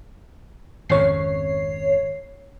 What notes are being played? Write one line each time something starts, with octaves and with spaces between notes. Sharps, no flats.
G#1 F2 C#3 C#5 C7